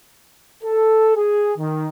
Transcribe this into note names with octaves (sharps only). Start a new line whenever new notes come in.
A4
G#4
D#3